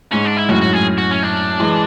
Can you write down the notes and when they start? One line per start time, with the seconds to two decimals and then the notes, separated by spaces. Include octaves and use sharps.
0.12 G#2 C#4
0.25 D4
0.37 E4
0.49 F#2 A2 F#4
0.61 F#4
0.73 G#4
0.98 F#4
1.11 C#4
1.23 D4
1.60 E3 G#3